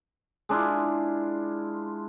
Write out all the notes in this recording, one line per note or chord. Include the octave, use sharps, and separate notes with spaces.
G#3 D4 E4 F4